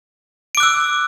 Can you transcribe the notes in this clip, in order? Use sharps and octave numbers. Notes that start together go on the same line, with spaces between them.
D6 E6 F#6 D7